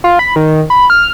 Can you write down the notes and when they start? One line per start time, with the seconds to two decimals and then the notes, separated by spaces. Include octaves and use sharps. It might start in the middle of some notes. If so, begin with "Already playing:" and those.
0.04 F4
0.19 B5
0.36 D#3
0.70 B5
0.90 F6